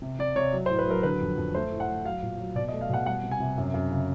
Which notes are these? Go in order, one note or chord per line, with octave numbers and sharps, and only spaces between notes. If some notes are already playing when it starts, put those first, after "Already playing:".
C3
C3 D5
C3 C#5
F#3
C5
A2
B4
F#3 A#4
D3 B4
F2
F2
A3 C5
A2
F#5
A2
F#3 F5
A#2
F#3
B2 D5
D#5
A3
F5
B2 F#5
G3 F#5
C3
G#5
C3
F#2
F#2
C#3